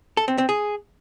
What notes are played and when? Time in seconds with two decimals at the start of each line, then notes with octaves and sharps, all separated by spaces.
0.17 A4
0.28 C4
0.38 C4
0.49 G#4